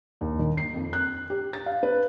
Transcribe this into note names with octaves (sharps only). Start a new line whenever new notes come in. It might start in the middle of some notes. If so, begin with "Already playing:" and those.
D#2
D#3
C7
F2
F#6
G4
A6
F5
B4